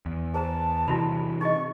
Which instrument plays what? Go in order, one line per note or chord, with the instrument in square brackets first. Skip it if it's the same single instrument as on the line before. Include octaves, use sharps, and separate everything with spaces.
[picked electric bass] E2
[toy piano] G#4 C5 A#5 [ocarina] A5
[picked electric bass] C3 E3 [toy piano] E4 F#4 B5
[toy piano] D#4 G#4 D#5 [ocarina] C#6